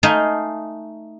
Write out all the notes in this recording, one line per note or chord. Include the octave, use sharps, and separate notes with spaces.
A3 D#4 F5 G#5